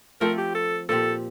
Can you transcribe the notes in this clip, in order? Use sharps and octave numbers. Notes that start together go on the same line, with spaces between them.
F3 A3 C4 A#4
G4
A4
A#2 F3 C4 G4 A4